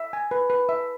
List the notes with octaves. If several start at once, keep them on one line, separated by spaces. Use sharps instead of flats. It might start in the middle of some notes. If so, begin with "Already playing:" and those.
Already playing: E5
G#5
B4
B4
E5